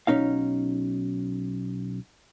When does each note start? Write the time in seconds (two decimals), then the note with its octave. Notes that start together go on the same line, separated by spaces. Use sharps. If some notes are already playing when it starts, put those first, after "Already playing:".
0.07 B1 C#4 D#4 F5